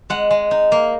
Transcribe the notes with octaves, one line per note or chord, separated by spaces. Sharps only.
G#3 F#5
G#3
D#4
A#3